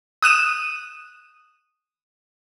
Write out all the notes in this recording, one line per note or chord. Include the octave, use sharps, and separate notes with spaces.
D#6 F#6 D#7 E7